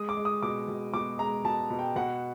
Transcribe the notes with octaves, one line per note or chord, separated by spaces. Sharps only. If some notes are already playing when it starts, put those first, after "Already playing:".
Already playing: G#3 D#6
D6
G#3
D#6
B2 D6
B2
B2 D6
G#3 A#5
B2 A5
B2
G5
B2 F#5